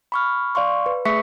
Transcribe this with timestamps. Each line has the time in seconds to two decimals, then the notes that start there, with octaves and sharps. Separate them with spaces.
0.12 B5 C#6 F6
0.55 D5 F5 C6 C#6
0.86 B4
1.05 A3 G#4 E5 C#6 B6 C#7